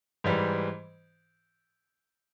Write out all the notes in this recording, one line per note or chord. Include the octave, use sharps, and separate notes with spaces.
G#2 E3 G3